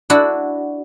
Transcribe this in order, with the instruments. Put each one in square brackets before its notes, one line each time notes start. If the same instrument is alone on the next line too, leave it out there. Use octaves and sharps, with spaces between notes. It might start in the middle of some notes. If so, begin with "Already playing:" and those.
[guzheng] D4 E4 F#4